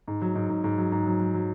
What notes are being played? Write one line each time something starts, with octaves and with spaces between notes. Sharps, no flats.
G#2
F#3
G#2
G#2
G#2
F#3
G#2
F#3
F#3
F#3